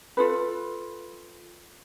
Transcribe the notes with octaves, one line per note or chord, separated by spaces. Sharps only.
F4 A4 B4